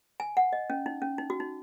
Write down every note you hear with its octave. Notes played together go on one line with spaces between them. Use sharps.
G#5
F#5
D#5
C#4
D#4
C#4
D#4
F#4
D#4